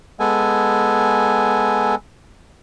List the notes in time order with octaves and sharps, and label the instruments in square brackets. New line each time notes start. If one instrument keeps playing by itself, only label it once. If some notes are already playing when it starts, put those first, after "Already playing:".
[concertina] G#3 B3 A4 G#5